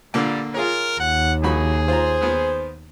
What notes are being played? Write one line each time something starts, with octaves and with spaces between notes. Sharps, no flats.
A#2 D3 G3 A#3
F4 G#4 A#4 C#5
D#2 F#5
A#1 F#4 G#4 B5
F4 C5 A#5
D#3 B3